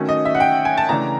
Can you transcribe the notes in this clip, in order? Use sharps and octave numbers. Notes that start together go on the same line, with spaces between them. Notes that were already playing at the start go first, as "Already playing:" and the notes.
Already playing: D#3 F#3 A3 C#4
D#5
E5
F#5
G5
G#5
A5
C#3 E3 A3 D4 A#5